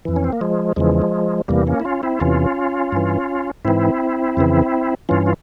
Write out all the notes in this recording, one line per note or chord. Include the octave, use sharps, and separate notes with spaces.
F2 E3
C#4
C4
A#3
F3 G#3
E2 C#3 E3 F3 G#3
E2 C3 E3 G3 A#3
A#3 C#4
E4
C#4 F4
C4 E4
E2 C3 E3 C#4 F4
G2 E3
G#2 E3 C4 E4
F2 C#3 E3
G2 E3 C#4 F4
F4